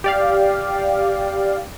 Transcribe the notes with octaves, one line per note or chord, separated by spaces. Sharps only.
G4 D5 F5